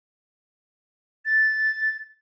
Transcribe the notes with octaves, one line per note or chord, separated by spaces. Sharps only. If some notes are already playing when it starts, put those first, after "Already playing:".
A6